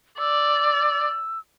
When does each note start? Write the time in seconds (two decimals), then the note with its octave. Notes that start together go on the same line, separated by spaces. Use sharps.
0.19 D5 E6